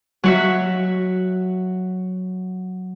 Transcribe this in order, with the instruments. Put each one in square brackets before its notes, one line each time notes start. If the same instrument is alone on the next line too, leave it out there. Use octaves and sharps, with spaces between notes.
[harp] F#3 F#4 E5